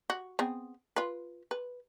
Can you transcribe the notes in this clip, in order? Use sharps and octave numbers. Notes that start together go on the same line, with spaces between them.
F#4
B3 C4 G#4
F4 B4
B4